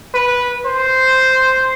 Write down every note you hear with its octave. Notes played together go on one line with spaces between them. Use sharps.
B4
C5